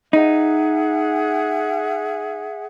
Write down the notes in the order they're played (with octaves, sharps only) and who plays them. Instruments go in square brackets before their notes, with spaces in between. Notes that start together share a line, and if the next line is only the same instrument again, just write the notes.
[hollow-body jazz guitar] D#4 [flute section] G#4 E5 F#5